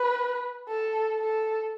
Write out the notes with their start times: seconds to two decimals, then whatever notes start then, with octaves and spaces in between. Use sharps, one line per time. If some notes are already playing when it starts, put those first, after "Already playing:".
Already playing: B4
0.68 A4
1.19 A4